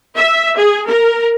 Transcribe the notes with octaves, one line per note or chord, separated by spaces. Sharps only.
E5
G#4
A#4